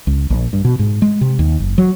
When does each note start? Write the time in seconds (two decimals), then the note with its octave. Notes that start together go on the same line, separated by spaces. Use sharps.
0.07 C#2
0.30 A#1
0.53 G2
0.65 B2
0.79 G#2
1.02 G#3
1.21 C3
1.39 D#2
1.60 F#1
1.78 F#3